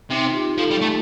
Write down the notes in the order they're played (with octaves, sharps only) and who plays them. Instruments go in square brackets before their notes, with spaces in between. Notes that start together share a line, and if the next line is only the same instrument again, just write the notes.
[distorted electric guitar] C3 [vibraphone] D#4
[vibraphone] F4
G4
[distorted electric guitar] F3 [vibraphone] A4
[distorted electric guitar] G3
A3